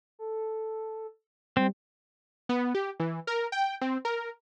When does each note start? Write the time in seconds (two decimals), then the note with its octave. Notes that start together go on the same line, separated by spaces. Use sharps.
0.19 A4
1.57 G3 C4
2.49 B3
2.75 G4
3.00 E3
3.27 A#4
3.52 G5
3.81 C4
4.05 A#4